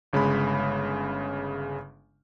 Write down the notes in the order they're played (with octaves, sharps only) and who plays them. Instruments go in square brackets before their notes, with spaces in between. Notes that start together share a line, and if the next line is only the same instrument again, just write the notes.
[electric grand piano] G1 C#3 G#3 B5